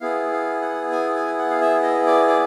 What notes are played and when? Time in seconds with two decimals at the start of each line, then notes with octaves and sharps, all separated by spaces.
0.01 B3 E4 G#4 F5
0.32 F5
0.62 F#5
0.92 G#5
1.14 G#5
1.38 F#5
1.50 F5
1.61 E5
1.83 D#5
2.07 D5
2.28 D5